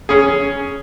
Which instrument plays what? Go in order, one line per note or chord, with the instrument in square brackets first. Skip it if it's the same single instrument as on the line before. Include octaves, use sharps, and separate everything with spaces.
[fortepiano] C#4 G#4